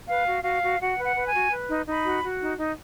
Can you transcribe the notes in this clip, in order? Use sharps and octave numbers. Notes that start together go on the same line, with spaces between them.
B4 F5
F#4
F#4 F5
F#4
F#4 F#5
B4
F#5
B4
G#5
F#4
B4
D#4
D#4 B5
F#4
F#4
D#4
D#4